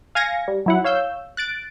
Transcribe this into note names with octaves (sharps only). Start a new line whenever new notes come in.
F5 G#5 G#6 A#6 C#7
G3
F#3 E4 F#5
C#5 F5 E6 G6
F#6 A6 D7